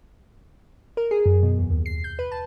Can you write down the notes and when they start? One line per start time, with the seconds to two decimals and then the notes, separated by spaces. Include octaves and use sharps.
0.97 A#4
1.11 G#4
1.26 F#2
1.43 B2
1.59 E2
1.70 D#2
1.86 C7
2.04 G6
2.19 B4
2.32 A5